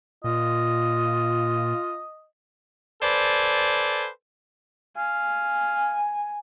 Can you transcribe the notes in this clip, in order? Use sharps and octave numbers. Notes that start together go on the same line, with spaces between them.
A#2 F4 D#5
A4 B4 C5 D5 G#5
F5 G#5